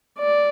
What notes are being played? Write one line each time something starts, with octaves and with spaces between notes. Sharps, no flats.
D5